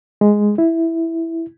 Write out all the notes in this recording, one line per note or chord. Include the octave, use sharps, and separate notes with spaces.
G#3
E4